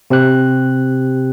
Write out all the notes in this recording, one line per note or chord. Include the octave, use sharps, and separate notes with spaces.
C3 C4 G4 F#6